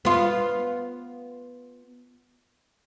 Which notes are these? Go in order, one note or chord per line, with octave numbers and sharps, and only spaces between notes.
B3 F4